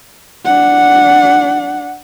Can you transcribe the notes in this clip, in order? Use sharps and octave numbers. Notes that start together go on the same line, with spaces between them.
D4 F#5